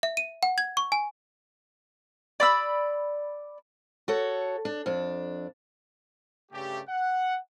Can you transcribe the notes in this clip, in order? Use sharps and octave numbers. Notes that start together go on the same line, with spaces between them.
E5
D#7
F#5
G#6
C#6
G#5
D5 B5 E6
F#4 A4 C#5
D4
F2 D4
G2 C#3 A3 G4
F#5